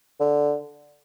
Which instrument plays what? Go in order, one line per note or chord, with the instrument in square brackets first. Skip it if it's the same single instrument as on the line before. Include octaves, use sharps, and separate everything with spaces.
[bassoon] D3